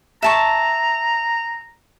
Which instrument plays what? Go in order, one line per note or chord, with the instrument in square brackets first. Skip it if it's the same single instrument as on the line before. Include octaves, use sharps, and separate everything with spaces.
[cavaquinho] E5 A5 C#6 [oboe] A#5